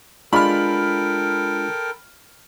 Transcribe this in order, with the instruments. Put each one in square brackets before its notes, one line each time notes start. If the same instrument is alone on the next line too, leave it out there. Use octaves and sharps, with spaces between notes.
[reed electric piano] G#3 D4 F4 [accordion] A4 A#4 G5 [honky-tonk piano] B5 F6